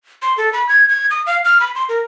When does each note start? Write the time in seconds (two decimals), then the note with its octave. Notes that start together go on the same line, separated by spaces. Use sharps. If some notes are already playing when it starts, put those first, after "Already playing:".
0.22 C6
0.37 A4
0.53 B5
0.69 G#6
0.89 G#6
1.10 D#6
1.27 F5
1.45 F6
1.60 B5
1.75 C6
1.89 A#4